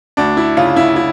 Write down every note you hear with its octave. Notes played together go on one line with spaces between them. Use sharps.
D2 D4
E4
C#3 F4
E4
E4